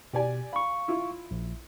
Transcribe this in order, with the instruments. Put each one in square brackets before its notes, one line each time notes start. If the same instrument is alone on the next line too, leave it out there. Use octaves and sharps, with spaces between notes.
[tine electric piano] B2 [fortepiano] G4 D5 G#5
[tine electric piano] F5 C#6 [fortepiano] B5
[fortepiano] E4 F4
[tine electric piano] A#1